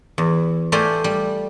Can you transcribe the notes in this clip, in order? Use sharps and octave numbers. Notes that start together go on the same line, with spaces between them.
E2
A3 F4 G4 C5 D5 G#5
G3